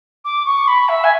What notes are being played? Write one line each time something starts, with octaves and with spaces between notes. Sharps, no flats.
D6
C#6
B5
E5
G#5